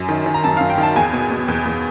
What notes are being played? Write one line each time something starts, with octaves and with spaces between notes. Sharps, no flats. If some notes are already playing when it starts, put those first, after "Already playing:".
Already playing: F#2
D#3
D#3
A#5
F#2 A5
F#2 F5
G5
D#3
A5
E2 G#5
B2
B2
E2
E2